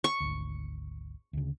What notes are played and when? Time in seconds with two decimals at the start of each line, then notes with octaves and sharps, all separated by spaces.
0.04 C#6
0.20 G#1 D2
1.33 D2 C#3